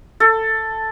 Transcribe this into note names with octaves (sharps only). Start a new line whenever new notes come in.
A4